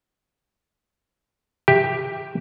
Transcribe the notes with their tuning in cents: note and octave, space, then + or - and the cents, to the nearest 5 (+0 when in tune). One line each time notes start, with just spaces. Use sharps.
G4 +5 E5 +0